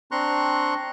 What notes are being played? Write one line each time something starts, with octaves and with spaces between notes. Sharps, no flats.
C4 D4 A#5 C6 C#6 F#6